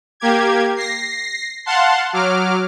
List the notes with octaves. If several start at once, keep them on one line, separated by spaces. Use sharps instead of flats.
A#3 G4 G#6
A#6 C7
F5 F#5 A5 C6
F#3 D6 F6